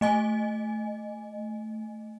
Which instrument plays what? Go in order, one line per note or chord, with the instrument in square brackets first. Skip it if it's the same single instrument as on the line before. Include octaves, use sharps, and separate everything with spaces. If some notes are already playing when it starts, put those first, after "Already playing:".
[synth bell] A3 D#5 G#5